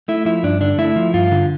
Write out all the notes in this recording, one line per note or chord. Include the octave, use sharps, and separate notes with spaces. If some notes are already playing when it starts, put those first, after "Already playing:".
A3 E4
F3 E4
G2 D4
D3 D4
A3 E4
F3
G2 F4
D3